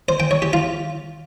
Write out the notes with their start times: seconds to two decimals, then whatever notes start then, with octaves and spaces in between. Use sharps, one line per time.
0.09 C5
0.20 G5
0.31 C#5
0.42 G4
0.53 F4